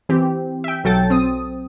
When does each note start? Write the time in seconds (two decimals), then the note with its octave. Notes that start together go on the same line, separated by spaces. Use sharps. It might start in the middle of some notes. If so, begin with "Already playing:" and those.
0.09 E3 C4 G4
0.64 E5 G5
0.84 B1 F#3 A4 G5 A6
1.10 C4 D#6